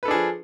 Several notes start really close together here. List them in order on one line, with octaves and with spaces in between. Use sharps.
B4 A4 D4 G#4 F3